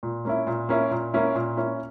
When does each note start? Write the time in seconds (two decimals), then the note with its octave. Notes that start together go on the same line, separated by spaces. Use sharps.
0.03 A#2
0.25 A#3 C#4 E4
0.47 A#2
0.69 A#3 C#4 E4
0.91 A#2
1.14 A#3 C#4 E4
1.35 A#2
1.57 A#3 C#4 E4